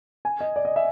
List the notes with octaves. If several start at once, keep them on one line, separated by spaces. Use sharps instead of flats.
G#5
D#5
D5
D#5
E5